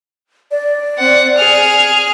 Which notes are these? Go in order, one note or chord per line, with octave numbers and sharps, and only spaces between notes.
D5
C4 F#5
G#4 F6